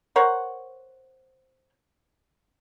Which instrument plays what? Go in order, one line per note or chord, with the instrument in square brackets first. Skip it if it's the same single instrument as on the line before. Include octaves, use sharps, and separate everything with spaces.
[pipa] A#4 C5 C#5 F#5